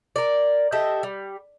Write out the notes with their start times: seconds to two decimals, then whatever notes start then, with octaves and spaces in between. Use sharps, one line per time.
0.16 A#4 D5
0.72 G4 A4 D#5 E5
1.03 G3